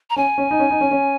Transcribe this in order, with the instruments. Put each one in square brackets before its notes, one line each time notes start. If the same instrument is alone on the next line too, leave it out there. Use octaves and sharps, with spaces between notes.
[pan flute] A#5
[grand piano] C#4 [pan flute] G#5
[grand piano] C#4
D#4
C#4
D#4
C#4
C#4